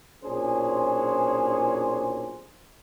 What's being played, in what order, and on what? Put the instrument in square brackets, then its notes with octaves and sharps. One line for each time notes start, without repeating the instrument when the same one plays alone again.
[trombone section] B1 A#2 C#4 D4 G#4 C5